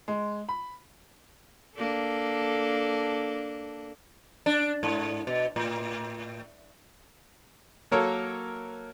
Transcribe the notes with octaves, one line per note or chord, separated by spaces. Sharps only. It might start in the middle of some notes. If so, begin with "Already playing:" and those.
G#3
B5
A#3 D4 A4
D4
G#2
B2
A2
F#3 A#3 A4 A#4 C#5